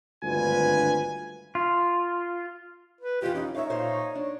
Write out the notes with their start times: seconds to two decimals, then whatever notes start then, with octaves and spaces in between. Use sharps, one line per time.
0.23 G#1 D2 G2 F4 B4 G#5
1.55 F4
3.01 B4
3.22 F2 E3 F4 G4
3.35 C#4 D#4
3.55 D#4 C#5 E5 F5
3.70 A#2 C5 F5
4.15 D4